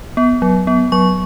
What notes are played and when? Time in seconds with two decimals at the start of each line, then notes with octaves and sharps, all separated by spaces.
0.17 B3
0.42 F#3
0.67 B3
0.92 F#3 C#6